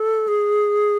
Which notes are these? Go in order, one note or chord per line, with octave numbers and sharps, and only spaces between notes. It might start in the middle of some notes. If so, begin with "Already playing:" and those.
Already playing: A4
G#4